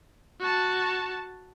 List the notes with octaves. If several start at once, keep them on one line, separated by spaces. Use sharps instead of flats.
F#4 A5